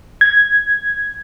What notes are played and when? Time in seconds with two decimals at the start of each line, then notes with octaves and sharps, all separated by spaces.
0.21 G#6